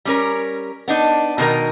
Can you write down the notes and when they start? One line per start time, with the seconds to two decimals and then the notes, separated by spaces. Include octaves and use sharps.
0.05 G3 C#4 A#4
0.88 B3 D4 D#4
1.38 B2 D#3 D#4 A#4